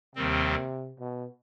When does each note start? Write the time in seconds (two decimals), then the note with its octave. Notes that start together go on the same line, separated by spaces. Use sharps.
0.16 D#2 C3 D#3 G3 C4
1.00 B2